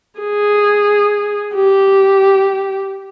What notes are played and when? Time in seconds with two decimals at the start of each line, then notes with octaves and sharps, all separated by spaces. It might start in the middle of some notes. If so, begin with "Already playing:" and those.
0.20 G#4
1.55 G4